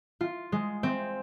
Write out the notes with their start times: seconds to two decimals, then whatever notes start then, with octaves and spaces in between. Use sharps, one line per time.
0.21 F4
0.52 G#3
0.83 C4